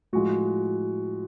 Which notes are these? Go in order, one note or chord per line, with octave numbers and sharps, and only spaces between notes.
A2 F3 G#3 F#4